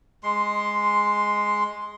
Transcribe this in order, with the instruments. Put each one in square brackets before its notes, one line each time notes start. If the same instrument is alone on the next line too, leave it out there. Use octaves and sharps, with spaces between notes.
[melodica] G#3 C6